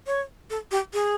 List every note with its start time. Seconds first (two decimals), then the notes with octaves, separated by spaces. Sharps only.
0.07 C#5
0.50 A4
0.71 G4
0.93 G#4